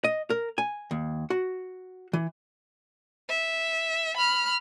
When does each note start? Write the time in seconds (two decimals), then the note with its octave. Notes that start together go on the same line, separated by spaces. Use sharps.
0.04 D#5
0.30 A#4
0.58 G#5
0.91 D#2
1.30 F#4
2.13 E3
3.29 E5
4.17 B5 F6